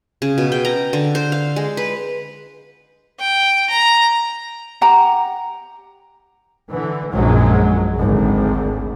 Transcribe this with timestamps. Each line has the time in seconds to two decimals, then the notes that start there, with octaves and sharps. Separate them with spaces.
0.22 C#3
0.38 B2
0.52 G5
0.65 A#5
0.93 D3
1.15 C5
1.32 F5
1.56 G#3
1.77 B4
3.20 G5
3.70 A#5
4.81 G4 F#5 G5 A#5
6.72 D3 E3
7.13 A#1 F#2 F#3 G#3
7.98 G#1 D2